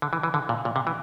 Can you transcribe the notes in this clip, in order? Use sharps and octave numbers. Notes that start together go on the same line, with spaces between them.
D3
E3
E3
D3
A#2
A#2
C3
E3